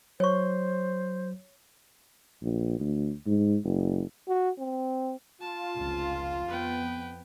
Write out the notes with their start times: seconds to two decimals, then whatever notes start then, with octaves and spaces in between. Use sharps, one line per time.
0.20 F#3 C5 C#5 C#6
2.42 A#1
2.80 D2
3.26 G#2
3.64 F#1
4.28 F#4
4.59 C4
5.41 F4 A5
5.75 F1 C#2
6.48 F2 B3 B4 G5